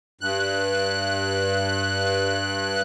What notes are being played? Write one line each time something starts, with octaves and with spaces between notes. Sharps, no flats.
G2 F#6